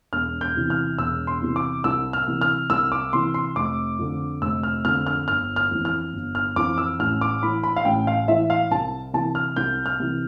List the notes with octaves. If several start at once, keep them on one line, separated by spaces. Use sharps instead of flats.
E1 F6
G6
E2 C3 E3
F6
E1 E6
C6
E2 C3 E3
D6
C2 E6
F6
C3 E3
F6
C2 E6
D6
C3 E3 C6
C6
F1 D6
F2 D3
F1 E6
F6
F2 D3 F6
F6
G1 F6
F6
F2 E3
F6
G1
F6
F2 E3 D6
E6
A1 F6
D6
A2 E3 B5
B5
F5
A1 G5
F5
A2 E3 E5
F5
C2 A5
C3 E3 A5
F6
C2 G6
F6
C3 E3